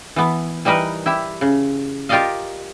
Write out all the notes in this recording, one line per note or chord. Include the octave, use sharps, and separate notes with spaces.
E3 B3
E3 G3 D#4 A#4 B4
E4 G4 E5
C#3
F4 G4 A#4 D5 D#5 F5